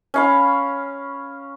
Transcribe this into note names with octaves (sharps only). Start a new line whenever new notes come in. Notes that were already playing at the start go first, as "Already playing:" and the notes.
C#4 F5 B5